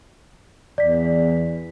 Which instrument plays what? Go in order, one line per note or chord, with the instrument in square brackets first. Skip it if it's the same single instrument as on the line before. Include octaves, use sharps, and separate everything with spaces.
[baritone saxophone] E2 [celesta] D5 B6